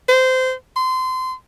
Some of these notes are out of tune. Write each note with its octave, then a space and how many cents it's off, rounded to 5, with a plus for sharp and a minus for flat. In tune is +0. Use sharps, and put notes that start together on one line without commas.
C5 -20
C6 -25